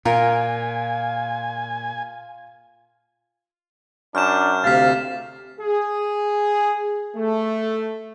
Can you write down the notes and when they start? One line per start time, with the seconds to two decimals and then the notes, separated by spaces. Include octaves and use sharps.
0.05 A#2 F4 A#4 G#5
4.15 F#2 D4 F6 G6 E7
4.64 D2 C3 F5 A6 B6
5.60 G#4
7.16 A3